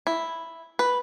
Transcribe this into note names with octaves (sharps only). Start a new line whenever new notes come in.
E4
B4